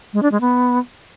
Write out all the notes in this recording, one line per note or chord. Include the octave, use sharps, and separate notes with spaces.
G#3
D4
G#3
B3